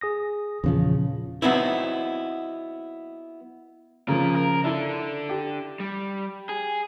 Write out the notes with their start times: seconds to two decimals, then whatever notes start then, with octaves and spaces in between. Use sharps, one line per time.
0.01 G#4 D#6 A#6
0.64 E2 A#2 C#3 F3
1.42 F#3 B3 C4 D#4 E4
4.08 C#3 F3 F4 A#4
4.35 A#4
4.64 D4 E4 A4
5.29 G4
5.80 G3
6.49 G#4